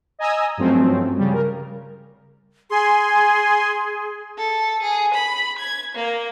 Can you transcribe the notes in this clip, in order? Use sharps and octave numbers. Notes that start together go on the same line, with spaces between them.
D#5 G#5 A#5 D#6 E6
G2 F3 F#3 A3 C4 C#4
C#3 G3
A#4
G#4 G#5 C6
A4
G#4
B5
G#6
A#3